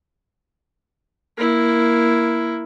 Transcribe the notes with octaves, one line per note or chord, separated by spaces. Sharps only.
A#3 E4